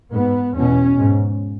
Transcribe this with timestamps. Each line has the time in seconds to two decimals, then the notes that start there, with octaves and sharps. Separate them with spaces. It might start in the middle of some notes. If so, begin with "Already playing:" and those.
0.12 G#2 B3
0.55 E2 B2 C#4
0.98 G#2